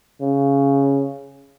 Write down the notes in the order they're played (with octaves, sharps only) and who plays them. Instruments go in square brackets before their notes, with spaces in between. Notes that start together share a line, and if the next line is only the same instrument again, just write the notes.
[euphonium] C#3